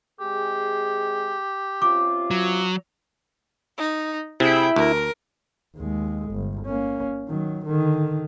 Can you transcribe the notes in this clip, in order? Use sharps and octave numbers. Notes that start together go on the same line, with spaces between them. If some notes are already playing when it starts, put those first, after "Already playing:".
C3 G#3 G4 G#4
C3 C#4 F4 D6
F#3
D#4
C3 E4 G#4 G5
D2 A#4
D#2 G#3
G1
A#3 C#4
D#3 F#3
D3 D#3